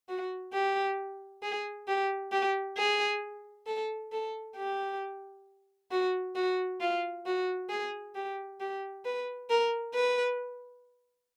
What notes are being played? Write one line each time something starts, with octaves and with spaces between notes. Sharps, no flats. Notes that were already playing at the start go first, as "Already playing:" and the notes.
F#4
G4
G#4
G4
G4
G#4
A4
A4
G4
F#4
F#4
F4
F#4
G#4
G4
G4
B4
A#4
B4